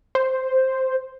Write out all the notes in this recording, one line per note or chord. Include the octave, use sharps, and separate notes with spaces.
C5